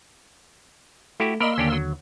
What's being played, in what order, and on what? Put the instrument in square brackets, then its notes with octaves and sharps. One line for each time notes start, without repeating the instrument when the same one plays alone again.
[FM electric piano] A3 [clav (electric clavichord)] E4 F#4 G4
[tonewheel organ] A#3 C6 E6 [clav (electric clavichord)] A#4 D5 [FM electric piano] D#5 B5
[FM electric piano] D#2 D3 [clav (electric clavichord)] C#4 D4 G4
[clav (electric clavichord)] F#3